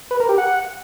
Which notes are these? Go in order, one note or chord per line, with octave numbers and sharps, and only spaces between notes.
B4
A#4
G4
F#5